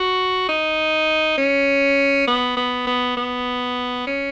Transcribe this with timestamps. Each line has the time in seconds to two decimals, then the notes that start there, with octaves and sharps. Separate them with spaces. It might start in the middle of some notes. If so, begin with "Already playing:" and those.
Already playing: F#4
0.49 D#4
1.38 C#4
2.27 B3
2.57 B3
2.87 B3
3.17 B3
4.07 C#4